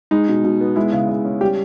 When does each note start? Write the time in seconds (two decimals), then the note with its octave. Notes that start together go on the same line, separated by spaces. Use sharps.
0.11 G#3 D#4
0.28 B2
0.44 B2
0.61 B3
0.76 G#3 E4
0.93 C#3
1.09 C#3
1.25 C#4
1.41 G3 G4